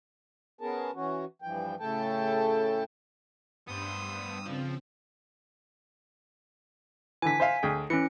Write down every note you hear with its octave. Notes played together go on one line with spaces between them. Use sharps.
B3 C#4 G#4 A#4 A5
E3 C#4 F#4
G2 E3 F3 G5
A2 C#3 A3 A4 G5 A5
G2 B3 C5 D#6 E6
C#3 F3 C4
D3 E3 G#5 B6
C5 E5 F5
D2 G#4 G5
E3 C#4 C#7